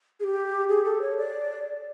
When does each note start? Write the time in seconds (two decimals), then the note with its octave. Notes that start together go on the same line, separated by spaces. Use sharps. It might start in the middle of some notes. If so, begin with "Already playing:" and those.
0.20 G#4
0.24 G4
0.69 G#4
0.85 A4
1.02 C#5
1.18 D5